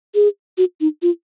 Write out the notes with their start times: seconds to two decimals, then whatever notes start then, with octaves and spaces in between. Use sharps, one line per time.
0.15 G#4
0.58 F#4
0.81 D#4
1.02 F4